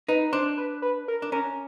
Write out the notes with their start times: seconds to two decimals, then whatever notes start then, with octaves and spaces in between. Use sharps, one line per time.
0.08 D#4 B4
0.33 D4 C5
0.58 B4
0.82 B4
1.08 A#4
1.22 D4
1.32 C#4 A#4